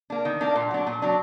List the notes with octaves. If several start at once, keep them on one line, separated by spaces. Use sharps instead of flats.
A#3 D4
D#3
A#3 D4
A#2
F#3 D4
A#2
F#3 D4